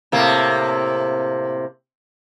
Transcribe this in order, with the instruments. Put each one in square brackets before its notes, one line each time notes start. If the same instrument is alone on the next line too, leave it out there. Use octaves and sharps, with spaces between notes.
[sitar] A2 C3 A#3